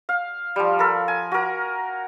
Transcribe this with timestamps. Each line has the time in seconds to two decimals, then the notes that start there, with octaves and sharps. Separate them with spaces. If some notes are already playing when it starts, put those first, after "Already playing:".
0.09 F5
0.56 F3 G3
0.79 A4 A#4 B5
1.08 G#5
1.32 F#4 A#4